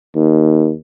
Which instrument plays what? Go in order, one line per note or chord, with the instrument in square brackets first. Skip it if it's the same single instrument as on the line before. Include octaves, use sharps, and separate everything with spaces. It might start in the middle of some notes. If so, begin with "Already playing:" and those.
[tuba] D#2